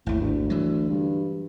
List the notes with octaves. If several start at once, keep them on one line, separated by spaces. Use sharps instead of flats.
G#1 D#2 A2
D2
E3 F#3
G2